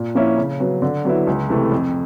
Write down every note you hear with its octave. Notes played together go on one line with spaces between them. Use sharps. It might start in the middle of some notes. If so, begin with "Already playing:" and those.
Already playing: A#2
F3 A#3 C#4 E4
C#3
F#3 B3
D3
F#3 B3 E4
C#2
C3 E3 A3
F2